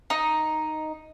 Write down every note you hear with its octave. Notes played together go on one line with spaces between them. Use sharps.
D#4